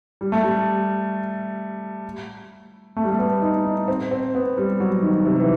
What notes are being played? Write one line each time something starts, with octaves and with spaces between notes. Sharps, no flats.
G3
A3
G3
A3
G3
A3
B3
D#4
D#4
C4
C4
B3
G3
F#3
D#3
C3
E3